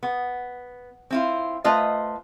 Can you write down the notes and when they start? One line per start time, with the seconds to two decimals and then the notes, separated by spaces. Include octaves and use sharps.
0.03 B3
1.10 C4 E4 F4
1.64 A3 F4 B4 C5 D#5